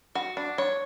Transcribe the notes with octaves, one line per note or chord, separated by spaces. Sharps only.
F#4
D4
C#5